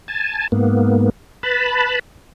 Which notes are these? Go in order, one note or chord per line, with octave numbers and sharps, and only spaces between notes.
G#5 A5
G#2 A#3 B3
B4 A5 B5